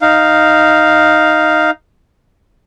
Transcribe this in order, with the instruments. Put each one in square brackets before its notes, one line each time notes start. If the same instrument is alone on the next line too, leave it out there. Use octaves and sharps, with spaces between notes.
[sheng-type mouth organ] D#4 F5